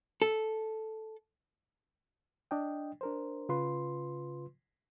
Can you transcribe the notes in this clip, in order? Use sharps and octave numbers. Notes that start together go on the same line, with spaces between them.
A4
D4 D#5 G5
D4 A#4 C5
C#3 F4 B4 C6